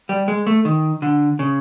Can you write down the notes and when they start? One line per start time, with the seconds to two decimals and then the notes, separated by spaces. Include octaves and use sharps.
0.09 G3
0.28 G#3
0.47 A3
0.65 D#3
1.02 D3
1.39 C#3